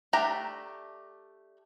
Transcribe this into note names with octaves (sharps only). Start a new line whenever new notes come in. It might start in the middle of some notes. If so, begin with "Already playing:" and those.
A3 D4 G4 A#5 B5